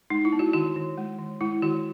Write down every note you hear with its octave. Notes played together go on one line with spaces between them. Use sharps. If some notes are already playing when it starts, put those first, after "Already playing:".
G#3 D#4
E4
B3
F#4
D#3 F#4
D#3
G#3
D#3
G#3 E4
D#3 F#4